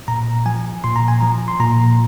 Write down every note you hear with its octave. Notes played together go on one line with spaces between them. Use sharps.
A#2 A#5
F3 G#5
A#2 C6
A#5
G#5
F3 A#5
C6
A#2 A#5